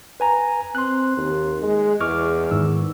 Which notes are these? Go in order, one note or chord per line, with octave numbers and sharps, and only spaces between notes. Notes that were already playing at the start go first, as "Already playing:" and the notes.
B4 G#5 A#5
C4 C6 F#6
D#2
G#3
E2 C#6 D6 F6
G#2 D#3 E6